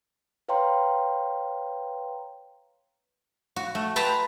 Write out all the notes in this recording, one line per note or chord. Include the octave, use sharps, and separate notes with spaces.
B4 C#5 F5 G5 A#5 C6
F#4
A3
B4 G5 A5 A#5 C6